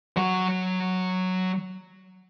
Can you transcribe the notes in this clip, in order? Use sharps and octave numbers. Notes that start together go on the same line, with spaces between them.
F#3 F#5